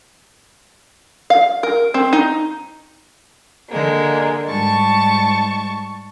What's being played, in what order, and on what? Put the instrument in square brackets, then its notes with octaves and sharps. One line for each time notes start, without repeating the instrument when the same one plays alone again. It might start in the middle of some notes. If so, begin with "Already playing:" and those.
[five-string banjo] F5
A#4
C4
D#4
[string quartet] D3 G#3 A#3
G#2 G3 A5 C#6 A6